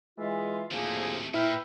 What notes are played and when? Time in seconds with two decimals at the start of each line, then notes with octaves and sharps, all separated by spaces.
0.18 E3 G#3 F4 E5
0.71 D2 A2 C3 D#3 F3 A3 A#3 G#4
1.34 A#2 E4 B4 E5 G5 F6